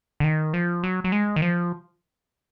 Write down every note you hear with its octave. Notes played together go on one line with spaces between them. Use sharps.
D3
D#3
F3
F#3
F#3
G#3
D#3
F3